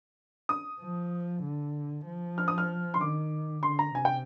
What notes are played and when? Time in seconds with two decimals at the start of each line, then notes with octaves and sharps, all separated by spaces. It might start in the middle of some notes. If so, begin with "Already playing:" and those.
0.49 D#6
0.80 F3
1.43 D3
2.06 F3
2.38 F6
2.48 D#6
2.58 F6
2.94 C6
3.00 D#3 D6
3.63 D3 C6
3.79 A#5
3.95 C3 G#5
4.05 G5